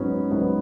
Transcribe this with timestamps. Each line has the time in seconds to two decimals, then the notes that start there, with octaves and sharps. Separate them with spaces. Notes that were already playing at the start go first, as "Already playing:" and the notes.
Already playing: G#2 F#3 B3 C#4
0.31 G#2 F#3 B3